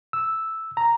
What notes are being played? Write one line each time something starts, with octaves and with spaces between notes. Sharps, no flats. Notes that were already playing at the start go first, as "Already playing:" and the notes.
E6
A#5